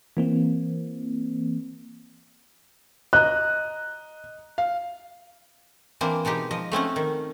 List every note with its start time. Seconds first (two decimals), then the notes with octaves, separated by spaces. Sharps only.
0.17 E3 A#3 C4
3.13 D#5 A#5 F#6
4.58 F5
6.01 E3 A#3 C4 D4
6.25 B2 G#3 D#4 G4
6.51 F3 D#5
6.72 A3 C4 C#4 F#5
6.96 D#3